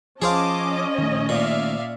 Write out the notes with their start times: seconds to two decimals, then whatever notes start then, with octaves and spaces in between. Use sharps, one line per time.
0.22 F3 C#4 G#4 C5 D#5 F5 A5 D6
0.98 A#1 D#3 A3
1.29 A#2 D5 E5 F5